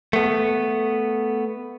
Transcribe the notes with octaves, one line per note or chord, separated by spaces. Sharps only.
A3 B3